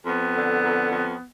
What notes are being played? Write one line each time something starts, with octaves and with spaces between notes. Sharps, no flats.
F2 B3
D3
F2
F2